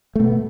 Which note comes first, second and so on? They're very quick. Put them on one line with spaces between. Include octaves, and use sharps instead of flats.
A3 B2 B3